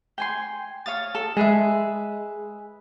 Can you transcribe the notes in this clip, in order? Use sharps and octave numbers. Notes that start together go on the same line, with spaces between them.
G5 G#5 C6
C#5 F5 D#6 A6
A4
G#3 G#4 B4 E5